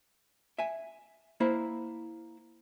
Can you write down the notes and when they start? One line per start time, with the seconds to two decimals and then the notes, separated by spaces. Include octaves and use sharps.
0.59 E5 G#5
1.40 A#3 E4 C5